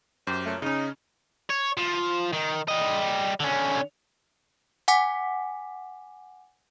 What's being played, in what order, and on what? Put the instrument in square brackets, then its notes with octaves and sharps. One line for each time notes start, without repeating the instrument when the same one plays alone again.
[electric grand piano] F#2 [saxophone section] G4 C5
[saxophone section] A#2 C#3 A3
[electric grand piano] C#3 C#4 [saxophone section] D#4
[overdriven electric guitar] C#5
F3
D#3
G3 D#5
D3 C#4
[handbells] F#5 G#5 D6 B6